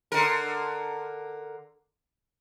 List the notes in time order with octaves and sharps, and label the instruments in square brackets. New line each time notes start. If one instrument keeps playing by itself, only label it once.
[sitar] D3 A#4